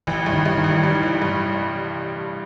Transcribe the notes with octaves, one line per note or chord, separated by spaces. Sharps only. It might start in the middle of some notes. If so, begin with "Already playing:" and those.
A1 E3
G2
D#3
G2
D#3
A1
G3
A1
G2